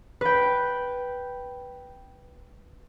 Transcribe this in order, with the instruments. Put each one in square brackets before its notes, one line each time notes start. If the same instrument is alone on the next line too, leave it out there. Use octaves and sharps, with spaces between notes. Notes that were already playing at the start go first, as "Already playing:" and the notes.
[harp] B4 G5